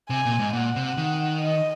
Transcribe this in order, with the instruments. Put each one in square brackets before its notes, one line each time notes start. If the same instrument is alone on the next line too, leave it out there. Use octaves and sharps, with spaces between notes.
[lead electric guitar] C3 [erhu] G#5
[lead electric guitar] A#2
G#2
[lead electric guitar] A#2 [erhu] F#5
[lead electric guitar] C3
D#3
[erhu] D#5